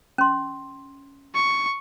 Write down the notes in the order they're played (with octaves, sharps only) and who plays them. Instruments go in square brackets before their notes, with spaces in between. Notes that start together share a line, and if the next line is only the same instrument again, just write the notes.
[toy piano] C#4 C6
[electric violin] C#6